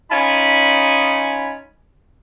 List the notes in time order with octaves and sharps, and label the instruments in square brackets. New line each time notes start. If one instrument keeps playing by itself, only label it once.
[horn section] C#4 D#4 F4 G#5 B5